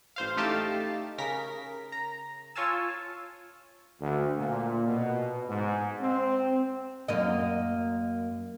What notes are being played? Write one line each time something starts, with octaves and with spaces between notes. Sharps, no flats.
A1 C5 F5
A3 D#4 G4 F5 A5
C#3 A#4 A#6 B6
A#5
F4 C#5 F5 G#5 A5 E6
D2
A#2
B2
G#2
C4
F#2 A#3 D#5